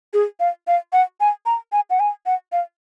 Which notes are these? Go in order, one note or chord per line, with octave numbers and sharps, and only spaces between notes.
G#4
F5
F5
F#5
G#5
A#5
G#5
F#5
G#5
F#5
F5